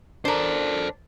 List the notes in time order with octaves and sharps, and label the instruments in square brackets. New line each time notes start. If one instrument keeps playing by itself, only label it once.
[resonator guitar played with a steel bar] D4 A#4 [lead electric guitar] A4 C5